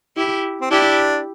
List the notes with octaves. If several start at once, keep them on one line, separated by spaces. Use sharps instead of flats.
E4 G4
C4
D4 E4 G4